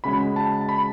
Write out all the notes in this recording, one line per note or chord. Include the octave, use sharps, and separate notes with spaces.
C#3 G#3 C#4 F#4 B5
A5
A5
B5